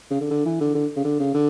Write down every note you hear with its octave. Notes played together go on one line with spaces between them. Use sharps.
C#3
D3
D3
E3
D3
D3
C#3
D3
C#3
D3